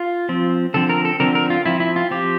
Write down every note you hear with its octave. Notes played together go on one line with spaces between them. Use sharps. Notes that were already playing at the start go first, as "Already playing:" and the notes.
Already playing: F4
F3 C4
D3 F3 C4 A4
A#4
A4
D3 F3 C4 A#4
A#4
F4
F3 C4 E4
E4
F4
F3 C4 G4